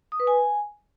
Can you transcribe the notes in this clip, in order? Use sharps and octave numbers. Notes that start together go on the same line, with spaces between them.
D#6
B4
G#5